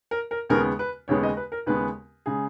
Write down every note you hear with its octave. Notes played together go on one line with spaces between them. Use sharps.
A#4
A#4
D#2 C#3 G#3 B3 A#4
B4
D#2 C#3 G#3 B3 C#5
D#5
B4
A#4
D#2 C#3 G#3 B3 B4
C#3 G#3 G#4